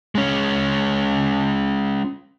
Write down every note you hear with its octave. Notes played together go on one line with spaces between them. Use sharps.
G#3 C#4